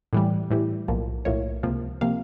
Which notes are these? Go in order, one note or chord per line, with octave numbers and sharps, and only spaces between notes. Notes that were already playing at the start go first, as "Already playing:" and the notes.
A2 E3 G3
A2 E3 G3
B1 A2 F3 A#3
B1 A2 F3 A#3 C#5
C#2 C3 F3 A#3
C3 F3 A#3 F5